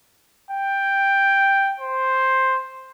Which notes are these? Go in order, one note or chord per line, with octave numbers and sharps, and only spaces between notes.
G5
C5